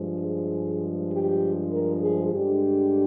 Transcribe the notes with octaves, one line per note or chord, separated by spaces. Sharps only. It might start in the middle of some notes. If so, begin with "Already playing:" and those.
Already playing: G2 F3 G#3
G#4
G4
A#4
G#4
G2 D3 G#3 G4